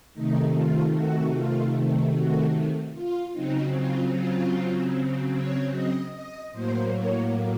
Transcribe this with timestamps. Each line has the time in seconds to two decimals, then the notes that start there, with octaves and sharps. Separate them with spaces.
0.14 C3 D#3 A3 D#4
0.54 F4
0.94 F#4
1.34 F4
2.14 F#4
2.94 F4
3.33 C#3 F#3 C4 D#4
3.73 F4
4.13 F4
5.33 C#5
5.73 D#5
6.12 D#5
6.52 A2 F#3 A#3 C5
6.92 C#5